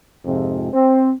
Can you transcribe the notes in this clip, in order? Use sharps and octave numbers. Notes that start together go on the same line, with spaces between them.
F2 G#2 C3 F3 G#3 C4
C4